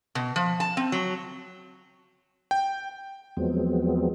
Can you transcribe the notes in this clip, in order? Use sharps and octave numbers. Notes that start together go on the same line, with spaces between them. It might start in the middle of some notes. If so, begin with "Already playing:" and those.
B2
F3
A5
C4
F#3
G5
E2 F3 F#3 G#3 B3 C4